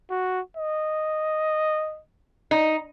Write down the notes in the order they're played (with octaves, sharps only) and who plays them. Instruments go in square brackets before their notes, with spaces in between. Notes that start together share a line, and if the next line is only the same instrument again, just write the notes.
[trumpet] F#4
D#5
[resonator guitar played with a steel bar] D#4